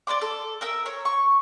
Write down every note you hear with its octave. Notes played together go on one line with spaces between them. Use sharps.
D5 D#5 C6 D6
A4
A#4 E5 E6
C#5
C#6